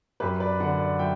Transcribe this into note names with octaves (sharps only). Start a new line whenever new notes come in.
F#2 G4 B4
B4 D5
D3 D5 F#5
D5 F#5
F#3 E5 G5